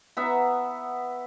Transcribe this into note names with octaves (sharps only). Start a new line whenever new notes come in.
B3 E5 F#5 A#5